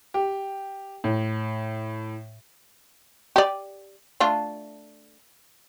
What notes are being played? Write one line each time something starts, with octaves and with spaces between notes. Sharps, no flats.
G4
A2
G4 D5
A3 D4 F4